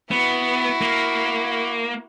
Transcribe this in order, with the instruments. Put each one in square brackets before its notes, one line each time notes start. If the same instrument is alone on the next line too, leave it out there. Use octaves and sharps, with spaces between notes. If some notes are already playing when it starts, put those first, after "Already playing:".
[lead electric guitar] B3 [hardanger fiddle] E4 F#4
[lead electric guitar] A#3